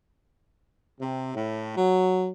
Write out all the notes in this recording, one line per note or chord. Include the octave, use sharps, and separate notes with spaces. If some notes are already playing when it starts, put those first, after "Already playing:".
C3
A2
F#3